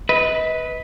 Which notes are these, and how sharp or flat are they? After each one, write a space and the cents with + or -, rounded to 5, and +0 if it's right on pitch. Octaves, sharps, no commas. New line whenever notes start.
B4 +0 D#5 +35